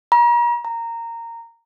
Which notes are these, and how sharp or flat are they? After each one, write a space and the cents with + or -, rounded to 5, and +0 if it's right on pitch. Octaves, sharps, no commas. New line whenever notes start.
A#5 +40
A#5 -15